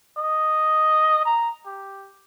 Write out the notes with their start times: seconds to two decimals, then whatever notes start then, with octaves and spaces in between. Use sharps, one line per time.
0.17 D#5
1.25 A#5
1.66 G4